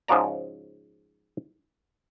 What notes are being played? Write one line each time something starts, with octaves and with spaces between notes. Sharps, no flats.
G#2 C#3 F3 F#4 D5 A#5